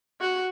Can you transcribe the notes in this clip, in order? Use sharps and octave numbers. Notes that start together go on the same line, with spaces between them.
F#4